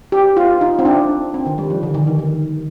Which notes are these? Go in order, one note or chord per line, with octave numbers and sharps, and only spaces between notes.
G4
F4
D#4
C4
D4
C4
D#3
G3
F3
D3
D#3
D#3
D#3